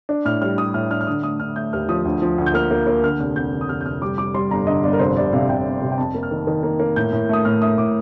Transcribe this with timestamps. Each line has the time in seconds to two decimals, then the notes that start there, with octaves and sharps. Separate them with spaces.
0.09 D4
0.25 A2 F6
0.42 G3 F6
0.58 G3 D#6
0.74 A2 F6
0.91 D4 F6
1.01 F6
1.07 D3 D#6
1.23 A3 D#6
1.40 D3 F6
1.56 A3 G6
1.73 D#2 F6
1.89 F3 D#6
2.05 D2
2.22 F3
2.38 D2
2.46 G6
2.54 A#3 F6
2.71 A#3
2.87 A#3
3.04 D3 F6
3.20 F1 F6
3.36 F1 G6
3.53 D3
3.61 D#6
3.69 F1 F6
3.81 G6
3.85 F1 F6
4.01 G3 D6
4.18 G3 D6
4.34 G3 C6
4.51 G1 A#5
4.67 D3 D#5
4.83 G1 D5
4.93 A#4
4.99 F1 C5
5.16 C3 D5
5.33 C3 F5
5.49 C3 G5
5.65 F1
5.82 C3
5.92 G5
5.98 F2 A5
6.15 A#3
6.23 F6
6.31 D#3
6.47 D#3
6.63 A#3
6.80 A#3
6.96 A2 G6
7.13 A2
7.29 A3 D#6
7.45 A2 F6
7.62 A3 D#6
7.78 A2 D6